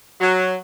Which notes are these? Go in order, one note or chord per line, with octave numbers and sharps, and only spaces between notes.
F#3